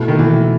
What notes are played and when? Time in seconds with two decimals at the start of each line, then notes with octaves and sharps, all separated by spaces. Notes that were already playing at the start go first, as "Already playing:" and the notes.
Already playing: B2 A3 E4
0.08 D#3
0.19 E3